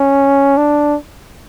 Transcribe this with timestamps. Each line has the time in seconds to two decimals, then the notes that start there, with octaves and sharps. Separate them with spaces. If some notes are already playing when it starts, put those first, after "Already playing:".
Already playing: C#4
0.57 D4